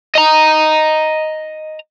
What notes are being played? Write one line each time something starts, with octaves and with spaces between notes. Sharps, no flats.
D#5 A#5